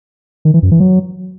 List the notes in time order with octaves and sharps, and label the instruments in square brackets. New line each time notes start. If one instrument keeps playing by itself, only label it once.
[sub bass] D#3
E3
F#2
E3
F#3